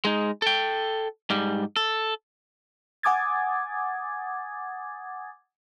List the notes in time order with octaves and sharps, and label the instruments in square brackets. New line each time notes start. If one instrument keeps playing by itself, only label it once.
[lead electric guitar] G#3 D#4
A4 G5
G#2 G3
A4
[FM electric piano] F#5 G#5 D6 D#6 G#6 A6